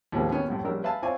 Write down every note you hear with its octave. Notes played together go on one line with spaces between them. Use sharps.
D#2 A2 F3 G#3 A#3 C4
D#3 A#3 B3 C#4
C2 F#2 A2
A#1 G3 C#4 A#4 E6
B4 E5 F5 G#5 A5
C4 E4 F4 C#5 D5 G#5